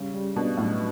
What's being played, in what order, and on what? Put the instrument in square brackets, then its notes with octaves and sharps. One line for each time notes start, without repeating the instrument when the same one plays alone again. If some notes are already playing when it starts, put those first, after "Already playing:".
Already playing: [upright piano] C#3 [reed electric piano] G3 C#4
[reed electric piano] G3
[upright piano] B2 [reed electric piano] D4
[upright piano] A2 [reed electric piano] F#3